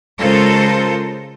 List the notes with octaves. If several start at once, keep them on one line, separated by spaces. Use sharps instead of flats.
C#3 G#3 F4 A4 A#4 C5